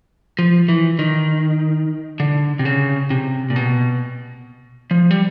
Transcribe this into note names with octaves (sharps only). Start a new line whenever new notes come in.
F3
E3
D#3
D3
C3
C#3
C3
A#2
B2
F3
G3